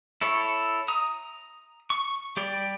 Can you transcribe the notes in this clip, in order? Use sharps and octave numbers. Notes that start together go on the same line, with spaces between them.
E4 A4 C#5
A#5 D#6
C#6
G3 G4 D5